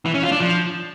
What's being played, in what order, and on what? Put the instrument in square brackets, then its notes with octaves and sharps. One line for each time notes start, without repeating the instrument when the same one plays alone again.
[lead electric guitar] E3
C#4
F4
D4
F3